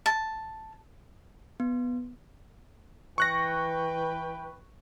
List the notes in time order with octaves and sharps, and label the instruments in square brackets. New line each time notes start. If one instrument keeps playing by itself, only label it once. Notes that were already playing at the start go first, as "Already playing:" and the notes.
[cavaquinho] A5
[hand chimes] B3
[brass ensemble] E3 B4 G5 [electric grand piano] C#6 F#6 A#6